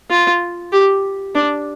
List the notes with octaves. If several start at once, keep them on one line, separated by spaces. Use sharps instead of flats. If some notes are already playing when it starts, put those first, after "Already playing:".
F4
G4
D4